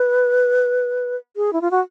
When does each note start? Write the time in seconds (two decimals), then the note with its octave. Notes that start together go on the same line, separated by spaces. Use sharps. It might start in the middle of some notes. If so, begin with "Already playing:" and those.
Already playing: B4
1.36 G#4
1.53 E4
1.61 F4
1.71 F#4